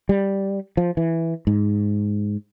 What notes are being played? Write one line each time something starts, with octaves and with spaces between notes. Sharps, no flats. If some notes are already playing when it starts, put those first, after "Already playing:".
G3
F3
E3
G#2